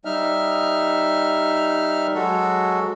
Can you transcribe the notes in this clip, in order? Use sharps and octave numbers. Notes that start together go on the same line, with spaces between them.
G3 D#4 E5 F6
F#3 G#3 F#4 A4